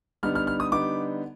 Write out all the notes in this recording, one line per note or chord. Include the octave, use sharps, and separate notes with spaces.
D3 G3 B3 D#4 F6
F6
F6
D#6
D3 G3 B3 D#4 D6